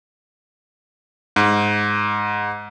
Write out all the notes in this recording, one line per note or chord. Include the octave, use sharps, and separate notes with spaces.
G#2